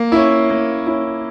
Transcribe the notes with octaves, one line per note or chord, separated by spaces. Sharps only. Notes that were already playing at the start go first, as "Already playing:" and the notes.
Already playing: A#3
C#4 E4
A#3
C#4 E4